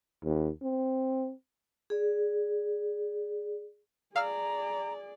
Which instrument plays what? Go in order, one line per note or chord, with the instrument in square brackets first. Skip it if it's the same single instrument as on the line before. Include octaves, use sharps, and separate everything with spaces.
[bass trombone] D#2
C4
[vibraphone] G#4 D5
[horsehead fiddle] G#4 D5 [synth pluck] F5 E6 F6 [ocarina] A#5